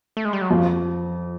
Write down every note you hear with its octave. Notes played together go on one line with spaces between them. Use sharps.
A3
G#3
G3
F#3
F2 F3